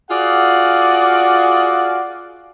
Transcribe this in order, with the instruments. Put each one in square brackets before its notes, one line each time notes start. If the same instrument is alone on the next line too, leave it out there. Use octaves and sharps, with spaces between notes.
[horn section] F4 F#4 G#4 D5 F5 F#5